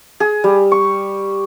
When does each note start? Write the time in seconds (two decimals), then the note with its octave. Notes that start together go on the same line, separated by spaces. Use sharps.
0.20 G#4
0.44 G3
0.72 C#6